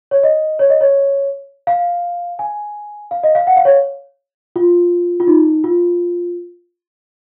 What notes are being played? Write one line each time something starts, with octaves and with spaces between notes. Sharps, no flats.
C#5
D#5
C#5
D#5
C#5
F5
G#5
F5
D#5
F5
F#5
F5
C#5
F4
F4
D#4
F4